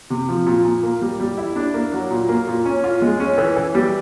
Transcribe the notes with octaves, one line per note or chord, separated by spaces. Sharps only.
C3
F3
A#2
A#2
A#3
G3
G3
E4
D4
A#3
F#3
A#2
A#3
A#2
C#4
F4
G#3
C#4
E3
E3
G3